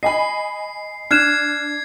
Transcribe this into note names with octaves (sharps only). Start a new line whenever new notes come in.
D#5 G#5 B5 C7
D4 F6 F#6 G#6 C7 E7